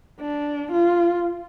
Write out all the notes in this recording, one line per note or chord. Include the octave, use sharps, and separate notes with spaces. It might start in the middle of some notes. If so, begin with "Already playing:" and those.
D4
F4